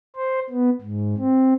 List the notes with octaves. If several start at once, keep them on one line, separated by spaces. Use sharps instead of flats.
C5
B3
G#2
C4